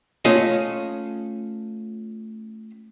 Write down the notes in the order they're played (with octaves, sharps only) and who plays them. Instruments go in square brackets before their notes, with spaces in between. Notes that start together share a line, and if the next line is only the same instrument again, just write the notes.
[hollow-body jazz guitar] A3 C#4 F4 A4 D#5